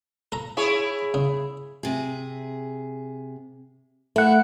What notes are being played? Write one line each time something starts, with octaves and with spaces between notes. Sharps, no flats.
A4 A#5
E4 G#4 C#5
C#3
C3 G#4
A3 E4 F#5